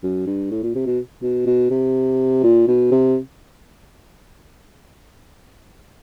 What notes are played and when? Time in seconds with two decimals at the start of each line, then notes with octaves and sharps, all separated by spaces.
0.03 F#2
0.26 G2
0.51 A2
0.63 A#2
0.75 C3
0.86 B2
1.22 B2
1.46 B2
1.70 C3
2.44 A#2
2.68 B2
2.91 C3